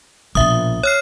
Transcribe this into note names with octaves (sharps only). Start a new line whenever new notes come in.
A#1 B2 E5 D#6
C#5 F6 C7